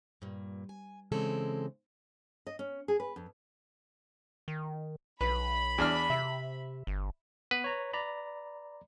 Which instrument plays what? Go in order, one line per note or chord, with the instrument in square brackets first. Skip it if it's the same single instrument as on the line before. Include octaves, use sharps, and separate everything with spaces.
[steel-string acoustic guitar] G2 A#2
G#5
C#3 E3 G#3 C4 A4
[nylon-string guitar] D#5
C#4
G#4
B4
F2
[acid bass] D#3
[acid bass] B1 [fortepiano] B4 [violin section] B5
[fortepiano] E2 D4 F6
[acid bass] C3 [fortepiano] E5
[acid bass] G1
[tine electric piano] B3 [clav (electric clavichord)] B4
[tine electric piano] C#5 A#5
D5 A#5 B5